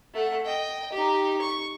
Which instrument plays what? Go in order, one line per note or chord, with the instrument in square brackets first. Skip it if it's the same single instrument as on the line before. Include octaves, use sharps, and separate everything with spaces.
[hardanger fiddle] A3 F#5
D#5 G5
D#4 G4
C#6